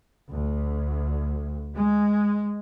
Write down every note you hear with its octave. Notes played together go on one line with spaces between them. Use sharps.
D2
G#3